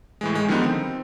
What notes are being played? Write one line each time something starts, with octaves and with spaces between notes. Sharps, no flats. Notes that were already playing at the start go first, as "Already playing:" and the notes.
A2 E3 G#3
D#3 G#3
D3 D#3 F3 G3 B3 D#4
C4